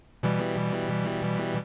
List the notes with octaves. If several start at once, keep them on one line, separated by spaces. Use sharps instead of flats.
B2 E3 G3